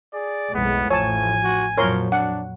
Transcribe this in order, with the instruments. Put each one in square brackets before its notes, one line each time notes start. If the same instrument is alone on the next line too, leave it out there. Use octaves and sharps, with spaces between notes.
[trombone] G#4 [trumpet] D5
[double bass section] B1 F2 G#3 [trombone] A2 [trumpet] B3
[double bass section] A1 F3 [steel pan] C#5 A5 [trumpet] G#5
[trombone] F#4
[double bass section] F2 A#2 F#3 [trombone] F3 [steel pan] A#4 C#5 C6
[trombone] D4 [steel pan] F#5